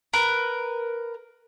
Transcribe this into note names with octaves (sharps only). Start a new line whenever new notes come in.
A#4 B4